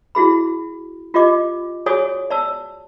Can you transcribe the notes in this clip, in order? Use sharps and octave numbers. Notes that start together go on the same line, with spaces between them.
E4 F#4 G#4 B5
F4 G4 D#5 D6
F#4 G#4 C#5 D5 G#5 D#6
D5 A5 E6